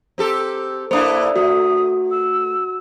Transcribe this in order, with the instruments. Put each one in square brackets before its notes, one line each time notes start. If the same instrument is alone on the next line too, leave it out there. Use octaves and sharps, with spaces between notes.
[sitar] C4 G4 A4
[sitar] A#3 D4 E4 [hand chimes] C5 D#6
[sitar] A3 [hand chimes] F#4 [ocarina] D#6
[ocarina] E6